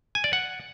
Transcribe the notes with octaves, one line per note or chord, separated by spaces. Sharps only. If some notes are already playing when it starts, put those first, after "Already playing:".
G#5
D5
F#5